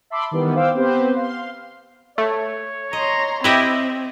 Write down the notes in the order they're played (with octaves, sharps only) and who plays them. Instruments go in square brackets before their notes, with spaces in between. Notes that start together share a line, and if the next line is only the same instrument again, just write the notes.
[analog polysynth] E5 A5 B5 C6 D6 E6
D#3 E3 G3 B3
C5 F5 G5 C6 D6 E6
B3 C4 G4 B4 C5
F5 C6
[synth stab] A3 [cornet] C#5
[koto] D#5 [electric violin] A#5 C6
[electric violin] C4 [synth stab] E4 G4 [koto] B4 D#5 E5